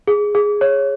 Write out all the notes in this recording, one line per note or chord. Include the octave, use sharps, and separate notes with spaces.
G#4
G#4
C#5